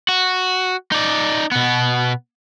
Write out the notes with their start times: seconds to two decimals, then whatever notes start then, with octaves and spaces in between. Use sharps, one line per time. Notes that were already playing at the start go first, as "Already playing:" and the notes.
0.09 F#4
0.92 D#4 D5
1.51 B2 B3